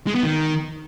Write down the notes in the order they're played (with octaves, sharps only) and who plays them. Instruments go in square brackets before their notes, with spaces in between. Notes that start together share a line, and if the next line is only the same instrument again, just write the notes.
[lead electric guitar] G#3
B3
D#3